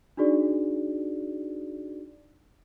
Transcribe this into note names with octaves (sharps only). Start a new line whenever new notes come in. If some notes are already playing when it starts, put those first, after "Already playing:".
D4 D#4 F#4 G#4 D5